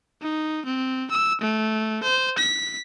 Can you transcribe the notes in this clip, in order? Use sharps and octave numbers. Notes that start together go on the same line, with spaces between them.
D#4
C4
E6
A3
C5
B6